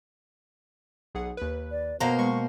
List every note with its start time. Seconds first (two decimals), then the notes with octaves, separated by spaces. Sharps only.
1.15 B1 G#4 F#5
1.37 D#2 B4
1.71 D5
2.00 B2 A#3 B3 C5 A#5
2.19 G#3 C#6 C#7